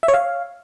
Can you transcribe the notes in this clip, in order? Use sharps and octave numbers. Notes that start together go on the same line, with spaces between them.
E5
C#5
F5